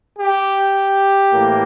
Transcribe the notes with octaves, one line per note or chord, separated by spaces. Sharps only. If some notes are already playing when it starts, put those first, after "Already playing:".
G4
A2 E3 A#3